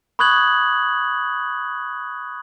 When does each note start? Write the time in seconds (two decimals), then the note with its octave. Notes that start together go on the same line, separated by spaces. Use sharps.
0.19 B5 C#6 D#6 F#6 G#6 F#7